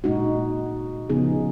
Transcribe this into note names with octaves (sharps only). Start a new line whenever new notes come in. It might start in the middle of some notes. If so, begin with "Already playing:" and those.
A#2 G#3 D#4 F#4
C#3 F3 B3 D#4 G#4